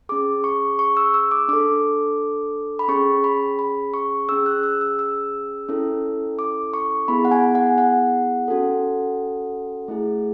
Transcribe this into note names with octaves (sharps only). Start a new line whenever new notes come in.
C#4 G#4 D6
C#6
C#6
E6
E6
D6
D4 A4 D6
B5
C#4 G#4 C#6
B5
B5
C#6
C#4 G#4 E6
F#6
E6
E6
E6
C#4 E4 A4
D6
C#6
B3 E4 G#4 B5
F#5
G#5
F#5
F#5
C#4 F#4 A4
A3 E4 G#4